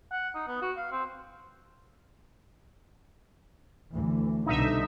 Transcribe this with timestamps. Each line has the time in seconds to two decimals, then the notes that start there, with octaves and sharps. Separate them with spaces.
0.12 F#5
0.35 D#4
0.48 B3
0.62 F#4
0.77 F5
0.92 C4
3.93 D2 E3
4.46 C2 B2 D3 D#4 E5